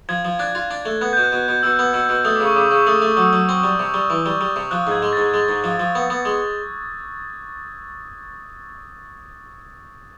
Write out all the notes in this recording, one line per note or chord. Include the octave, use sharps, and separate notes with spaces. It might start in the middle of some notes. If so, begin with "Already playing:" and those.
F3 G#6
F3
D4 F#6
F4
D4
A3
B3 F#6
B2 G6
F#6
B2
B2
B2 E6
B3
B2 E6
B2
A3 D#6
C#3 D6
C#6
C#3 D6
C#3
A3 D#6
A3
F#3 E6
F#3
C4
G3
C3
G3
E3
G3
G3
C3
F3 F#6
G#2 G#6
G#3
G#2 A6
G#3
G#2
F3
F3
B3
B3
G#3